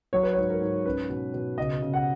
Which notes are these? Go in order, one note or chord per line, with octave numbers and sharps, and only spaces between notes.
F#3 C#5
B4
C#5
G#2
A#4
G#2
C#4 B4
B2
B2
C#3 D#5
C#3
F#5